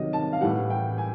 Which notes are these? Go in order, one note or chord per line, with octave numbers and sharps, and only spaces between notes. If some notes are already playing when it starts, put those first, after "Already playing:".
Already playing: C3 D#3 F#3 D#5
A5
F5
A2 E3 G3 F#5
G5
G#5